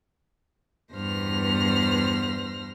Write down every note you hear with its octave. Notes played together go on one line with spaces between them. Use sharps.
E2 G2 B3 C5 F6 A#6